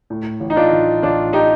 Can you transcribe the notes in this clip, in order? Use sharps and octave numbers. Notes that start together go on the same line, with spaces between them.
A2
A1
D#4
D4 F4
A1
A1 D4 F4
D#4 G4